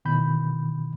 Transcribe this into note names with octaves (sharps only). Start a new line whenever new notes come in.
B2 D#3 E3 B5 G6